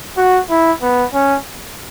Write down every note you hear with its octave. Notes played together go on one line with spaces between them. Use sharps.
F#4
E4
B3
C#4